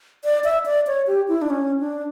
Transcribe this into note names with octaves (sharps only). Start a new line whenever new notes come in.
D5
E5
D5
C#5
G4
E4
D4
C#4
D4